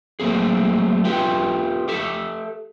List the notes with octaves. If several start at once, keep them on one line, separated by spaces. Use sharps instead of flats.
F#3 A3 A#3 C4 G#4
F4 G4 B4 E5 G5
G4 A4 E5